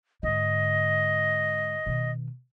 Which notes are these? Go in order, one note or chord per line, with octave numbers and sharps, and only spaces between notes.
G#2 D3 D#5
B2 D#3